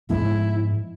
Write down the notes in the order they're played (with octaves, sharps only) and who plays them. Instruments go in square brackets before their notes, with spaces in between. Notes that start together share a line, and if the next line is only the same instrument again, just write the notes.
[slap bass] G#2 F3 G#3 B3 [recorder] E4